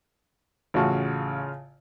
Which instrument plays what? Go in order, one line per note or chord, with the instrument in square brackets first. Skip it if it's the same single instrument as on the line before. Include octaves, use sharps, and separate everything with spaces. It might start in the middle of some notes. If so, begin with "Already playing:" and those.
[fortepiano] A1 F#4 [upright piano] C#3 F4 A5